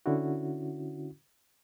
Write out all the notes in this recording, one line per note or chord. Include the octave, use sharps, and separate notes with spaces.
D3 C#4 E4 F#4